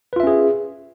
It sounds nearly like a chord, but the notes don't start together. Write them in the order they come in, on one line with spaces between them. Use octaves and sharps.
B4 F4 E5 C#4 G#4